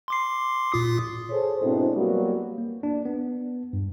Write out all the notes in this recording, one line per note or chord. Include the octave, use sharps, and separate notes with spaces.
C6 D6 C7
A#2 F4 D#6
G#4 A4 C5 C#5
G#2 B2 C4 D4 E4
F#3 G3 A#3 B3 F#4
A#3
D4
B3
G2